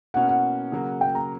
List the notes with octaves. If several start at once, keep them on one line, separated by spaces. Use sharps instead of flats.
B2 A#3 C#4 E4 F#5
F#5
C#3 F#3 A#3
G5
A#5